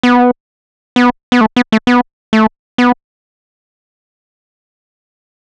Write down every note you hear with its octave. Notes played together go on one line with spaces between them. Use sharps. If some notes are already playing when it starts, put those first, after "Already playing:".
B3
B3
B3
A3
B3
A3
B3
A3
B3